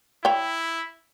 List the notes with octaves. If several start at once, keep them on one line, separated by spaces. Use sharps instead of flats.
E4 C#5 G5